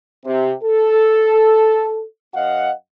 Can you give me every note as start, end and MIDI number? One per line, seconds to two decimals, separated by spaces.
0.25 0.53 48
0.64 2.05 69
2.35 2.71 42
2.35 2.71 75
2.35 2.71 77
2.35 2.71 78